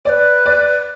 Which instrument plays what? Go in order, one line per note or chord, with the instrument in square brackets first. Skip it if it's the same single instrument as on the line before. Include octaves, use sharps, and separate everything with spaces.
[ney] B4 C#5 [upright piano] D5
[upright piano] D5